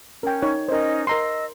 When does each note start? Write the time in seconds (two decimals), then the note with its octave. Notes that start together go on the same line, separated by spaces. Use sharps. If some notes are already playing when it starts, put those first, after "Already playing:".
0.23 C#4 A#4 G5
0.42 D#4 C#5
0.68 C#4 D#4 A#4 C5 D#5
1.07 A#4 D#5 A#5 C6 E6